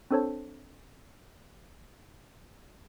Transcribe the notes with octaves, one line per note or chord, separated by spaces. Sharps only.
C4 D4 A4 C5 C#5 A5